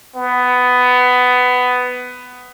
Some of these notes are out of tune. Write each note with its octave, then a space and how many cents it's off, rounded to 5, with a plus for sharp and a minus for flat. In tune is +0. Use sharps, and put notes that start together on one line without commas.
B3 +15